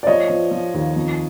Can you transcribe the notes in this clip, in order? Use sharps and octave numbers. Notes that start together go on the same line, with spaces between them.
D5
F3 C#5 D#5
F3
F3
D#2
F2